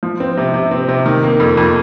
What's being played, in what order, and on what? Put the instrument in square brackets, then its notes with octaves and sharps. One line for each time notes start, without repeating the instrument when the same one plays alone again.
[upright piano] F3
C4
C3
C3
C4
C3
D#3
A#3
F2
F2